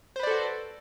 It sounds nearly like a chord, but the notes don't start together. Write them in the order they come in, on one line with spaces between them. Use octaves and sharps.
C5 B4 D5 A4 F#4